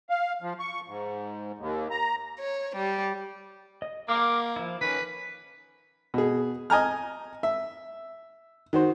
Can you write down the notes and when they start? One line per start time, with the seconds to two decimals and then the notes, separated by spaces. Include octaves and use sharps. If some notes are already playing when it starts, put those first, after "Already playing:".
0.09 F5
0.42 F3
0.59 C#6
0.87 G#2
1.58 D#2
1.91 A#5
2.40 C#5
2.76 G3
3.82 D#5
4.08 A#3 D6 F6
4.56 F3 E4
4.81 D#3 C#4 B4
6.14 B2 G#4
6.70 D#5 G#5 A#5 F6
7.43 E5
8.73 D#3 F#4 C5